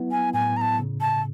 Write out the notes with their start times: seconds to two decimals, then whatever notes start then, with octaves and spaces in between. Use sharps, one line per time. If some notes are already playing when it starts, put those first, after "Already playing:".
Already playing: F#3 B3 E4
0.11 G#5
0.34 A2 G#5
0.57 A#5
0.61 A5
0.79 C#3
1.01 A5